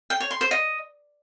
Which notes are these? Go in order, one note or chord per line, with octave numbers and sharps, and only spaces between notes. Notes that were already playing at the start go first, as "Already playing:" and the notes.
G5
C#5
C6
C5
D#5